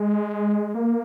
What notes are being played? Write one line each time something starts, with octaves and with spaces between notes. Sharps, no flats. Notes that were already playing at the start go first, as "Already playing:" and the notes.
Already playing: G#3
A#3